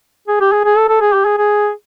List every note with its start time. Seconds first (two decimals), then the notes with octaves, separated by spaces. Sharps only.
0.28 G#4
0.41 G4
0.52 G#4
0.65 G#4
0.77 A4
0.89 A4
1.01 G#4
1.13 G4
1.26 G#4
1.38 G#4